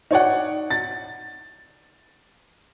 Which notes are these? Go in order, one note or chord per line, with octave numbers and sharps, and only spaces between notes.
D#4 C#5 D5 F#5
A6